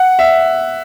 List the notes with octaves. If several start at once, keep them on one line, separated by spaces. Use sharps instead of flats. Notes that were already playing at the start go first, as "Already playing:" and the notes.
Already playing: F#5
E5